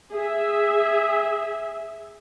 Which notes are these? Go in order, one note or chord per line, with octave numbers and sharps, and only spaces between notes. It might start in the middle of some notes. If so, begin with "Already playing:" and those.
G#4 E5